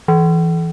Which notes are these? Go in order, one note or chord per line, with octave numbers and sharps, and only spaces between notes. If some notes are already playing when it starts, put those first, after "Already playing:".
E3